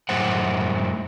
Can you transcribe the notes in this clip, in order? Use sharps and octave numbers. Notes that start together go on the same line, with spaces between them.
F#2 A2 C5 F#5